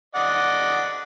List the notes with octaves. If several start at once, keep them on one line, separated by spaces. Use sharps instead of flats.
D5 D#5 F#5